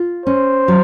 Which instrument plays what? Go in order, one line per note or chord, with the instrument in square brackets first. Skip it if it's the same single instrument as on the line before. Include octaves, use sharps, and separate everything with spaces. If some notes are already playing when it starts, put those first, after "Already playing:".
Already playing: [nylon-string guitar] F4
[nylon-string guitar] C#4 [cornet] C5
[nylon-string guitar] F#3